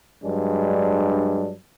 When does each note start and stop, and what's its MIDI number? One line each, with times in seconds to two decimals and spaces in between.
0.24 1.53 43
0.24 1.53 54
0.24 1.53 56
0.24 1.53 62